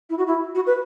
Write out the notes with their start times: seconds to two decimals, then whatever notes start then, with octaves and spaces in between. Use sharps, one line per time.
0.10 E4
0.18 F#4
0.27 E4
0.55 F#4
0.67 B4